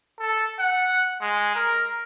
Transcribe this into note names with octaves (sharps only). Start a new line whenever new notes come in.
A4
F#5
G#3
A#4